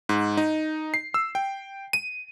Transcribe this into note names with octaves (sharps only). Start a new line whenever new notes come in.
G#2
D#4
C7
E6
G5
D#7